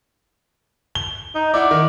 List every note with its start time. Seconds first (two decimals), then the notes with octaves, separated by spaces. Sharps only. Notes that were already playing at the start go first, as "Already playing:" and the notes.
0.95 G7
1.35 D#4
1.54 E4 D5 F#5
1.71 D#3